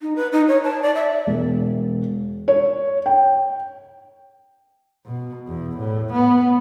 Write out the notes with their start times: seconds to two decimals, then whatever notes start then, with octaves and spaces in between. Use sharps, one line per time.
0.01 D#4
0.16 B4
0.32 D#4
0.48 C#5
0.64 A5
0.82 D5
0.95 E5
1.27 E1
2.48 C#5
3.06 G5
5.05 B2
5.47 E2
5.78 A2
6.13 B3